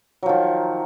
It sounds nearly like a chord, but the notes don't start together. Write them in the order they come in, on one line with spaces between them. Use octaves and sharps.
F#3 F3 D#3